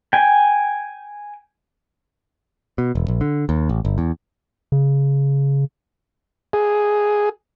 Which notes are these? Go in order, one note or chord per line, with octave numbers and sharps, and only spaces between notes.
G5 G#5
B2
E1
A#1
D3
D#2
A1
G1
E2
C#3
G#4